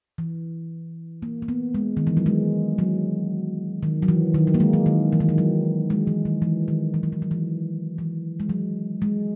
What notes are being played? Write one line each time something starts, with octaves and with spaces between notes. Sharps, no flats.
E3
A#3
A#3
B3
G#3
D#3
E3
F#3
G#3
F#3
D#3
F#3
E3
D#3
F#3
A#3
G#3
F#3
D#3
E3
D#3
E3
F#3
G#3
E3
D#3
E3
D#3
E3
F#3
E3
F#3
E3
E3
G#3
F#3
G#3